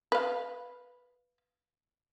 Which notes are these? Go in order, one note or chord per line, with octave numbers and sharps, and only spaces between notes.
B4 F5